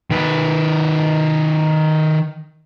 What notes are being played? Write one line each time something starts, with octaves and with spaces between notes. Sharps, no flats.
D#3 B4